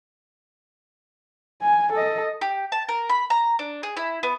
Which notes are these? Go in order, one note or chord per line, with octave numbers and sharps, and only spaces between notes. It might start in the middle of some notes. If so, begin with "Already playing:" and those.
G#5
A4 D#5
G4
A5
A#4
B5
A#5
D4
G#4
E4
B3